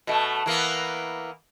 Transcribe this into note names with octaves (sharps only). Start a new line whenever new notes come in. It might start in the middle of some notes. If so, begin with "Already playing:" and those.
B2 A3
E3 A#3 B3